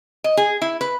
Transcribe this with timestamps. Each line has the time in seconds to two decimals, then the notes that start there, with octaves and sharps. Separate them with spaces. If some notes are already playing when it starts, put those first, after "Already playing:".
0.24 D#5
0.37 G#4
0.62 E4
0.81 B4